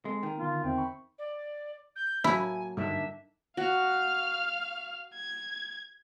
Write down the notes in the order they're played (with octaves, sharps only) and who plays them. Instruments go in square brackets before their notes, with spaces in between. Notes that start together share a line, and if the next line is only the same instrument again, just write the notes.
[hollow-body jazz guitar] G#3 [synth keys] C4 A4
[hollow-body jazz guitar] D#3 [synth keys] G5
[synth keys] D3 B3 [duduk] F4
[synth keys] E2 E5 [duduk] C4
[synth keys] B5 C#6
[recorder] D5
G6
[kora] A2 F#3 A#3 [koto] E4 [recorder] G#5
[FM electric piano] G2 [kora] D3 D#3 D4 [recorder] E5
[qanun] F#4 [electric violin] F5 F6
[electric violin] G#6